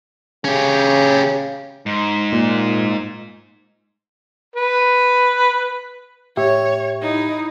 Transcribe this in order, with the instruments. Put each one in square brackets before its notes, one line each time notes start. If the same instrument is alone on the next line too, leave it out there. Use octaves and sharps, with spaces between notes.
[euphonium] C#3 [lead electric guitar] C#4 G4
[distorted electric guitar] G#2
[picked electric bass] A#2
[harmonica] B4
[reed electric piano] A2 G4 E5 [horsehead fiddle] C#5
[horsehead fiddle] D#4 E4